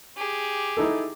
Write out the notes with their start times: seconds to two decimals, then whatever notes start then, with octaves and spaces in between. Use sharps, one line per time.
0.17 G4 G#4
0.77 D#4 E4 A4